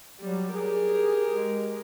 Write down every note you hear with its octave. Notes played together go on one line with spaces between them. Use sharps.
F#3 G3
G4 G#4 A#4
G#3